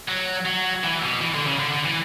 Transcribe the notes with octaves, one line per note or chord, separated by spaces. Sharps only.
F#3
F#3
E3
B2
E3
D3
C#3
D3
D3
E3